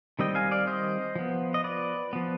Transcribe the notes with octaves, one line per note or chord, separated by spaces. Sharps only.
D#3 G3 C4 D#5 G5
F5 G#5
D5 F5
C5 D#5
F3 B3
D#5
B4 D5
F3 B3